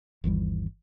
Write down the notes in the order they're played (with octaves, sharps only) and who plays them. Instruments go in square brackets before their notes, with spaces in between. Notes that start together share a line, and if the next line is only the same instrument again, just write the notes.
[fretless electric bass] G1 D#2 E3 G3